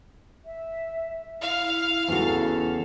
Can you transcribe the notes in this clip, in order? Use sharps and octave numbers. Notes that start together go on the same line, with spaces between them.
E5
E4 F5
E2 C#3 F#4 A4